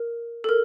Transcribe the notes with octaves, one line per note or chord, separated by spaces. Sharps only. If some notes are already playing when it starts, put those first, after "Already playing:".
Already playing: A#4
A4
A#4